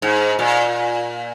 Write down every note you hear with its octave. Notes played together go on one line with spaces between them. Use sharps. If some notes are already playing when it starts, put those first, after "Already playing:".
G#2
A#2